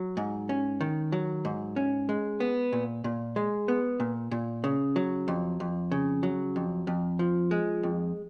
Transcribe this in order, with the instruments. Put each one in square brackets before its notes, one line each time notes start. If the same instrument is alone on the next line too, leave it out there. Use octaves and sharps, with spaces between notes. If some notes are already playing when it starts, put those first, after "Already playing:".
Already playing: [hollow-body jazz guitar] F#3
G#2
C#4
D#3
F#3
G#2
C#4
G#3
B3
A#2
A#2
G#3
B3
A#2
A#2
C#3
F#3
F2
F2
C#3
F#3
F2
F2
F3
G#3
F2